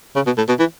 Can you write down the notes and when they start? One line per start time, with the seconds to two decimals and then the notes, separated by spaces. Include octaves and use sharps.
0.16 C#3
0.26 B2
0.37 A2
0.49 B2
0.59 E3